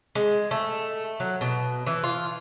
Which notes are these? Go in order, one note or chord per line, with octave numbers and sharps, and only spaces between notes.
G#3
A3
F#3
B2
E3
F4